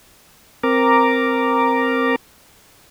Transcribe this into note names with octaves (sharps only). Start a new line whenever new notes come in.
C4 A#4 A#5 D6